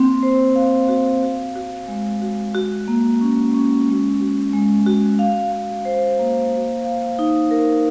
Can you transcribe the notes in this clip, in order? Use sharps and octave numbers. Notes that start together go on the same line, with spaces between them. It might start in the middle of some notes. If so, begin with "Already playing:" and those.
Already playing: A#3 C4
C5
F5
F#4
F#4
F#4
G#3
F#4
F#4
A#3
C#4
C#4
G#3
F#4
G#3
F#4
F5
F5
C5
A#3
F5
F5
D#4
A#4